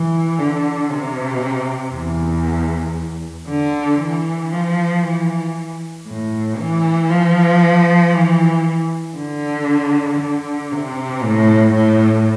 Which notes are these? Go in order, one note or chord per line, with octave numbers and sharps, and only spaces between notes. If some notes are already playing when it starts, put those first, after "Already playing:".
Already playing: E3
D3
C3
E2
D3
E3
F3
E3
A2
E3
F3
E3
D3
D3
C3
A2
A2